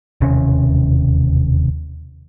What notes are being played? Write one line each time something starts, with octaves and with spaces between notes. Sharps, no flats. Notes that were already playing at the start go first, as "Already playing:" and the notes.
E1 D#2 C3 C#4